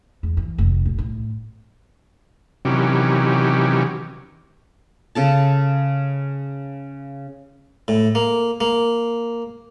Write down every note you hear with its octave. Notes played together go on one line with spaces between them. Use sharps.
E2
E3
F1
A#1 A2
A2
C3 D#3 E3 F#3 C#4 G4
C#3 A4 A5
A2
A#3
A#3